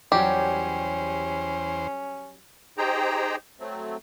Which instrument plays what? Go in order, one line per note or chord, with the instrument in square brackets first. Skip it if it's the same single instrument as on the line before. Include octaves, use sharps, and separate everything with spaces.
[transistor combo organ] E2 C5 [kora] F#3 G3 A#4 [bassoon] C#4 [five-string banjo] G4
[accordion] D#4 G4 G#4 C5 G5 A#5
F#3 A3 C4